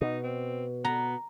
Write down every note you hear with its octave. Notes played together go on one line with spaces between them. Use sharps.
B2 D#4
C4
B3 A#5